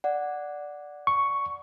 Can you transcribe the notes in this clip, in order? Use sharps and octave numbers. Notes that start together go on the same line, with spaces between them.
D5 F#5
C#6